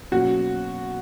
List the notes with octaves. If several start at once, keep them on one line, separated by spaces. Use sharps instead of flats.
B2 F#3 A#3 C#4 F#4